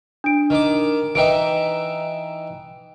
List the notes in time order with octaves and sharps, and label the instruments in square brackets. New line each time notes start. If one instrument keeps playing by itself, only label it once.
[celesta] D4 D7
[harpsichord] D#3 D6
[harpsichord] E3 D#4 E5 [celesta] G5 D7